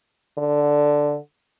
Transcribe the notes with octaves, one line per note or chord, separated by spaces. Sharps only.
D3